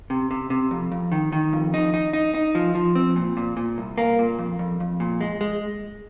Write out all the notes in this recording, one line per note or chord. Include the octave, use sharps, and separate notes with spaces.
C3
C3
C3
F2
F2
D#3
D#3
F2
D#4
D#4
D#4
D#4
F3
F3
C4
A#2
A#2
A#2
C2
A#3
A#2
F2
F2
F2
A#2
G#3
G#3